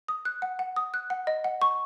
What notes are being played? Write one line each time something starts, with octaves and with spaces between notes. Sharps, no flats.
D#6
F#6
F#5
F#5
D#6
F#6
F#5
D#5
F#5
C#6